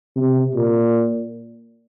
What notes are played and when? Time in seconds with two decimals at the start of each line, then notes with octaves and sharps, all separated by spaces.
0.16 C3
0.55 A#2